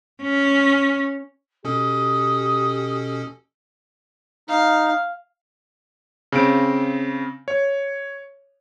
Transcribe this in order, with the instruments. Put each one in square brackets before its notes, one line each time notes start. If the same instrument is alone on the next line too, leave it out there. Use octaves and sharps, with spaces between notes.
[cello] C#4
[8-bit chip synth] B2 C#4 A4 [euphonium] G4 [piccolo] D#6
[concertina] D#4 [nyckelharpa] F5
[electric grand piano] C#3 C4 D7
C#5